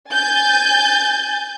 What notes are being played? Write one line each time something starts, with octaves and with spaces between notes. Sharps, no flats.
G#5 G6 A6